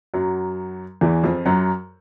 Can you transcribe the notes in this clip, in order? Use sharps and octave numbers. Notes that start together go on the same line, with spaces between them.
F#2 F#3
E2 E3
F2 F3
F#2 F#3